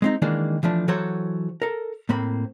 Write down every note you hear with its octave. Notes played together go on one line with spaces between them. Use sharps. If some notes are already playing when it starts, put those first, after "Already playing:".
G#3 C4 D#4
D#3 E3 G#3 A#3 D4
E3 F3 A3 D4
E3 F#3 F#4 A4 C5 C#5
A4 A#4
A2 A#3 C4 B5